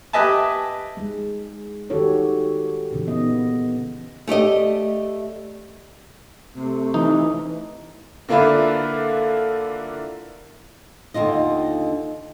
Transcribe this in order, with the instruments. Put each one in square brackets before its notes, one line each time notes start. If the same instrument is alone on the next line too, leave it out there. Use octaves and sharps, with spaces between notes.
[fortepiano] G4 B4 D#5 E5 G#5 A5
[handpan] G#3
D#3 F#4 G4 A4 C#5
A#2 C#3 E3
B3 D#5
[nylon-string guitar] A3 G4 D5 D#5
[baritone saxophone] C3 [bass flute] A3
[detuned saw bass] E3 [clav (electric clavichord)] D#4
[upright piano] D3 A#3 D4 E4 F4 B4
[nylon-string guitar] D#2 D3 F4 D#5